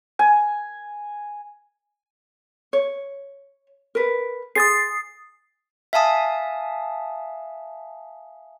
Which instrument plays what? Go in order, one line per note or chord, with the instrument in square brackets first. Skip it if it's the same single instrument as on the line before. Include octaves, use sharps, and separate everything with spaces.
[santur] G#5
[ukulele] C#5
A#4 B4
[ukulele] G#4 C5 [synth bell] D#6 A6 C7
[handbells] E5 F5 G#5 A5 D#6